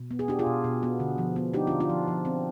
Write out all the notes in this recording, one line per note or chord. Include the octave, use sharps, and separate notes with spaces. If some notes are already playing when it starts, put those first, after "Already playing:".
Already playing: B2
B3
G#4
D4 G4
F4 G#4
B2
B2
B3
D3
F3
B3
D4 D#4 G4
D3 D4 F4
D4 F4
F3
F3
C4